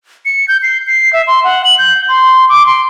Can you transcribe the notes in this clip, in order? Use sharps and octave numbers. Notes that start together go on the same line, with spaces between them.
C#7
G6
C7
C7
E5
C6
F#5
F#7
G6
C6
D6
C6